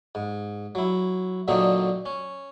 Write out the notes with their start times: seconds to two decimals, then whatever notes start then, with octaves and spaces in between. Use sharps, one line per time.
0.15 G#2
0.75 F#3 E4
1.48 A#2 D3 F#3 A3 C4 D#4
2.06 C#4